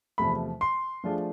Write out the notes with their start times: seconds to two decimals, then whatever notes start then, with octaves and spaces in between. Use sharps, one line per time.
0.18 E2 C3 F3 A3 B5
0.61 C6
1.04 F3 A3 D4 F4 G#4